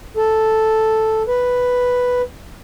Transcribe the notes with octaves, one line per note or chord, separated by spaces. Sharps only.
A4
B4